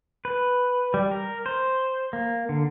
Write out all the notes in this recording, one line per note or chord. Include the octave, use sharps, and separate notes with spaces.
B4
G3
A#4
C5
A#3
D3